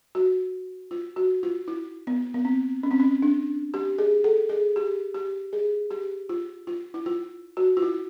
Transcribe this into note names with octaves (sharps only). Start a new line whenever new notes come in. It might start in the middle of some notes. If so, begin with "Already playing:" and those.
F#4
F4
F#4
F4
E4
B3
B3
C4
C#4
C4
C#4
D4
G4
G#4
A4
G#4
G4
G4
G#4
G4
F4
F4
E4
F4
F#4
F4
E4